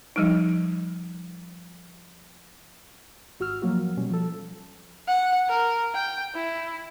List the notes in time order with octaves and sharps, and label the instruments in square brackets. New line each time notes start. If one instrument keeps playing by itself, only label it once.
[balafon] F3 G3 D#4
[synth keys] G#1 F#4 E6 F6
F3 F#3 A#3 F#4
B2 G3 C#4
F3 A4
[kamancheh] F#5
A#4
G5
E4